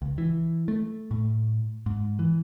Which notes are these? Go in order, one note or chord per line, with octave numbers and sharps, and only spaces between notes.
C#2
E3
A3
A2
G#2
E3